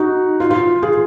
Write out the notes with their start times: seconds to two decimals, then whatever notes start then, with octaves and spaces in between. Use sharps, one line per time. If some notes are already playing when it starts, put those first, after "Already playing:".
Already playing: D#4 F#4
0.40 F4
0.50 F4
0.83 F4 G#4